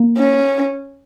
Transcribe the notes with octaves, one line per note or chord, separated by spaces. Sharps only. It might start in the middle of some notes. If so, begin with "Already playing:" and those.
Already playing: A#3
C#4